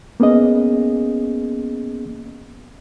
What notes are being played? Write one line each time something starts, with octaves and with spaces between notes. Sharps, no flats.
A#3 B3 C#4 G#4 D#5